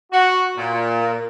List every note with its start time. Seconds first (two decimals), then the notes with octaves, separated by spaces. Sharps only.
0.12 F#4
0.57 A#2